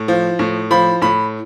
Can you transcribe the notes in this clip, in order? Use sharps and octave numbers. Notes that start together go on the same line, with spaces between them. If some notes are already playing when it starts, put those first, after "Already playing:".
Already playing: A2
F3
A2
F3 B5
A2 B5